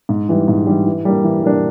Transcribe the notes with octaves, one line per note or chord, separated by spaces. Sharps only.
G#2
E3 G3
G#2
E3 G3
E3
G3 A#3 D4
E3
G3 A#3 D4